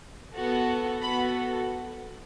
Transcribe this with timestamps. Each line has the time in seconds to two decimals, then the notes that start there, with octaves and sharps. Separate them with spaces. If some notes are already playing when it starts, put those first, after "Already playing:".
0.34 B3 F#4 A4
1.01 B3 F#4 A4 B5